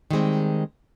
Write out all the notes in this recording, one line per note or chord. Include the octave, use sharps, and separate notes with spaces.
D#3 G3 G#3 C4